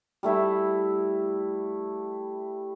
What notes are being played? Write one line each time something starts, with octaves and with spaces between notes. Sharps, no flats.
G3 A3 E4 E5